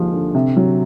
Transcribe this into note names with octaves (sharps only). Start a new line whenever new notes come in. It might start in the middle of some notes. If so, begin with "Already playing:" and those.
Already playing: D#2 F3 G#3
D3
C3
F#3